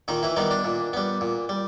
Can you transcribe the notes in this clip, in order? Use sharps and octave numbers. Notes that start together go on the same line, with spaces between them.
A#2 D#3 D#4
E3 E4
D#3 G3 B3 D#4
D4
A#2
G3 B3
A#2
G3